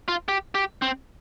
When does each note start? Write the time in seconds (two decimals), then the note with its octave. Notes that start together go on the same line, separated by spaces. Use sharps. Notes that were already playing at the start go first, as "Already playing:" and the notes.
0.08 F4
0.28 G4
0.55 G4
0.82 C4